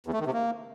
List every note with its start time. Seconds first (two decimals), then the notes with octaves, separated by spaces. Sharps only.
0.06 E2
0.13 A3
0.20 D#3
0.26 C3
0.33 A#3